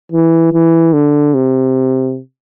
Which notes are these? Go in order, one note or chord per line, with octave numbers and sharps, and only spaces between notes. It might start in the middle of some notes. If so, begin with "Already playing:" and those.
E3
E3
D3
C3